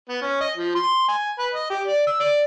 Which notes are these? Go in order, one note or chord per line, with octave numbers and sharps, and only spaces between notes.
B3
C#4
D#5
F3
C6
G#5
B4
D#5
G4
D5
E6
D5